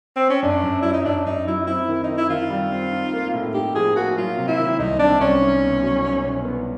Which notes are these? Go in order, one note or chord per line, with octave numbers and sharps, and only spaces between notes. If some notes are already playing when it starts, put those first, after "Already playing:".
C4
C#4
F#2 D4
F#2
F#3 E4
D#4
F#2 D4
F#2 D#4
F#3 E4
C4 E4
D#3
D#3 D#4
E4
D#3 F4
G3
C4
D#4
A#3
A2
D#4 G4
F3 G#4
A#3 F#4
F#3 F4
C3
E4
D#3
C2 D#4
C3 D4
C2 C#4
D#4
B2
F#3
B2
B2
B3